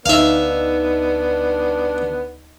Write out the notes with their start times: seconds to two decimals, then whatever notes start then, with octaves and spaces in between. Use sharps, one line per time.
0.06 D2 B3 D4 D#4 E5 F5